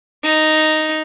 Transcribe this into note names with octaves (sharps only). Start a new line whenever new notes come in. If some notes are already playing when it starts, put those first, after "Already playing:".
D#4